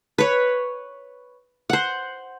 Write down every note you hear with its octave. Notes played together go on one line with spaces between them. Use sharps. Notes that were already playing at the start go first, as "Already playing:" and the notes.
B4 C#5
C5 F#5